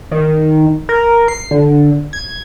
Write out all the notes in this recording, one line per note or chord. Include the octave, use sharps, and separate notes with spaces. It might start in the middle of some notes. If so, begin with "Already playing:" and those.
D#3
A#4
C7
D3
G#6